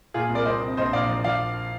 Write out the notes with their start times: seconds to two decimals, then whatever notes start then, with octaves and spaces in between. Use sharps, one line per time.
0.14 A#2 F4 G#4
0.30 C2
0.35 A#4 D5
0.45 C2 C5 D#5
0.62 C3
0.77 A#1 C5 D#5
0.93 A#2 D5 F5
1.09 F3
1.24 F3 D5 F5